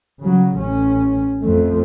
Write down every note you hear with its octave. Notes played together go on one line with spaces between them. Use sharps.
C#3 F#3
A1 C#4
F2 A3